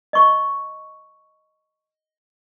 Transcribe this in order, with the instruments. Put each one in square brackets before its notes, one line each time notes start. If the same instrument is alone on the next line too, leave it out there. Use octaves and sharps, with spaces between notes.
[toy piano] D#5 C#6